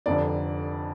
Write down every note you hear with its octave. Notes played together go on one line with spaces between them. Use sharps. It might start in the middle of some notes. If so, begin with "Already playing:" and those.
F1 F2 D3 D5